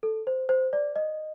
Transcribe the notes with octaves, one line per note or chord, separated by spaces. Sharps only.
A4
C5
C5
D5
D#5